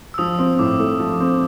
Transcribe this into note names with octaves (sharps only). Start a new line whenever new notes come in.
E6
F3 D#6
C4
A2 D6
A3
F3
C4